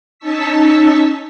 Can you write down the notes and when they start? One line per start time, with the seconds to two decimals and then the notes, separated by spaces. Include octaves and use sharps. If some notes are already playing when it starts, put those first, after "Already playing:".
0.19 C#4 D#4 A5 C#6 E6 B6